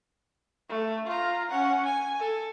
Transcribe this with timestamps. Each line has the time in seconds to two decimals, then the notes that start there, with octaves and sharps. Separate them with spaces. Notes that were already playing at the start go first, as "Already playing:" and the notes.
0.69 A3
1.06 F4 A#5
1.49 C#4 F#5
1.85 G#5
2.20 A4